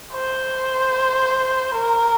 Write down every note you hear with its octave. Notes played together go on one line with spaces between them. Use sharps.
C5
A#4